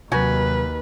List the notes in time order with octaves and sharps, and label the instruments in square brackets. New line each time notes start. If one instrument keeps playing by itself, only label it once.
[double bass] D#2 [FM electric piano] C3 F#3 [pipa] D#4 F#4 G#5 [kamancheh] B4